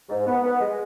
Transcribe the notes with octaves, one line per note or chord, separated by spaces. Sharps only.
G#2
B3
B3
G#3